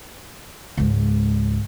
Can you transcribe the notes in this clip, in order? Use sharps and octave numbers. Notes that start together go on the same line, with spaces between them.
C#2 G#2